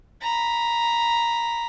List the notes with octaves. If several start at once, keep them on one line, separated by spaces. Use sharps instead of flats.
A#5 B5